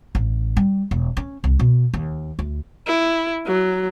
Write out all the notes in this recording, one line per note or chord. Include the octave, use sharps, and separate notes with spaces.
A1
G3
E1
C#4
C2
B2
D#2
D2
E4
F#3